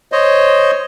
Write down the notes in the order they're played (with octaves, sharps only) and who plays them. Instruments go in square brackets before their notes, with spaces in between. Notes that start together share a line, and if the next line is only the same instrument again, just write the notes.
[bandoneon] C5 C#5 D#5